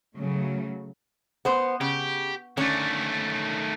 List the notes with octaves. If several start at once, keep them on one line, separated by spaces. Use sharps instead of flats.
C#3 F#3 A3
B3 C5
C#3 G4
D3 D#3 A3 C#4